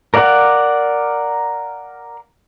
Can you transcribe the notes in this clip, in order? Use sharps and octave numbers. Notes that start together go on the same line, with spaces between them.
A#4 D5 F5 F#5